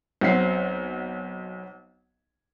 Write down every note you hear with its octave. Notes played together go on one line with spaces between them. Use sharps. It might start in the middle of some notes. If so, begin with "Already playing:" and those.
B1 F#3 C4 F#5 B6 C7